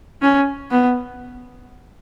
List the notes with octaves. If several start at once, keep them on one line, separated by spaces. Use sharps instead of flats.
C#4
B3